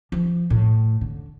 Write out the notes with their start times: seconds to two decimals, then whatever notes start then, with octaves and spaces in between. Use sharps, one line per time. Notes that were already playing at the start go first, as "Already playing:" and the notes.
0.12 F3
0.50 A2
1.01 D3